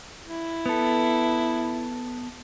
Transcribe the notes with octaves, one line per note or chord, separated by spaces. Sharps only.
E4
B3 A4